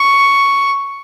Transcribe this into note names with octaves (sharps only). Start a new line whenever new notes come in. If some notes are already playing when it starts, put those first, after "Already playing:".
Already playing: C#6